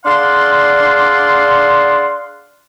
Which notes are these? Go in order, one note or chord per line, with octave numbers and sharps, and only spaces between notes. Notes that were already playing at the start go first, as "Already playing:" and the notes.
D4 G#4 D5 F5 F#5 C6